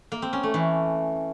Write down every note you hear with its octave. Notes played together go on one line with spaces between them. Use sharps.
A#3
C4
C#4
A3
E3